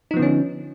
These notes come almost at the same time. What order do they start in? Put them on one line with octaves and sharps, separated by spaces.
D#4 F3 B3 D3 C#4